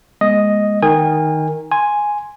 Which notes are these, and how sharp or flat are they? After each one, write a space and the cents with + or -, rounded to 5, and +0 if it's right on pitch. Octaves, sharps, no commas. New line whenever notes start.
G#3 +0 B3 -45 D#5 +0
D#3 +0 A#4 +0 G#5 -30
G#5 +0 C6 +0